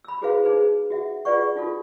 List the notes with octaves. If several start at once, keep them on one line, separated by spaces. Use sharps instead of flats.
B5 E6
E4 F#4 G#4 B4 C5 F5
D#4 G#4 B4 C5
F#4 E5 F#5
F4 G#4 B4 D5 F#5 C#6
D#4 F4 F#4 A4